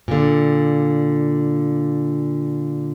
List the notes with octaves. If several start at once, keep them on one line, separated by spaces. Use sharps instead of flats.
A#2 D3